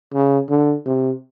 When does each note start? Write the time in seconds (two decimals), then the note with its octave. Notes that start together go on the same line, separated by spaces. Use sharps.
0.14 C#3
0.50 D3
0.86 C3